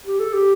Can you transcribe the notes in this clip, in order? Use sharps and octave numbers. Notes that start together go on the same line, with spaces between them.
G4
A4
G4